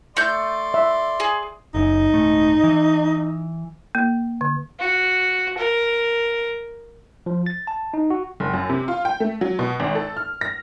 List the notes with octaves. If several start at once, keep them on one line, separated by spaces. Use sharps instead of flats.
A3 D5 C6 G6
E5
G#4
F#1 F#2 D#4
D#1 G#2 A3
E3
A#3
D3
F#4
A#4
F3
A6
A5
D#4
F#4
F#1
F#2
C3
F4
G5
A3
F#3
B2
G#1
A4
F6
A#6